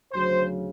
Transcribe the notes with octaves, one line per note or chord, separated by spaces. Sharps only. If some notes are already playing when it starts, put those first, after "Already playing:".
D2 C#3 F#3 C5